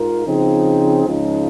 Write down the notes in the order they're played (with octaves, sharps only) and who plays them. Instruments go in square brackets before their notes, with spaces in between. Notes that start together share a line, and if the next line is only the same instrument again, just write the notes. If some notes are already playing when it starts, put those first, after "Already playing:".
Already playing: [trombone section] G#2 F4 A#4
C#3 F3 C4 D#4 G#4
C#2 C#3 F3 G#3 D#4